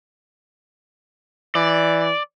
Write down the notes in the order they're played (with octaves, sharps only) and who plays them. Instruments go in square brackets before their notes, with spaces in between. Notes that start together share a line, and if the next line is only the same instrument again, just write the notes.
[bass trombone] E3 [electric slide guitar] D5